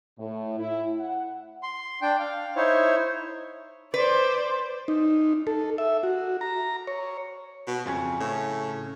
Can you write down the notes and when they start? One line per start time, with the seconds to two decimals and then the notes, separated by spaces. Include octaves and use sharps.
0.19 A2
0.59 E4
0.99 F#5
1.63 C6
2.02 D4 G5
2.19 F5
2.56 D#4 E4 C5 C#5
3.94 B4 C5 D5
4.88 D#4
5.47 A4
5.78 E5
6.03 F#4
6.41 A#5
6.87 C#5
7.67 B2
7.86 F2 C#3 C#4
8.20 A2